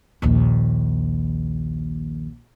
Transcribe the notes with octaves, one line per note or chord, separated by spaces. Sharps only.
A#1 D#2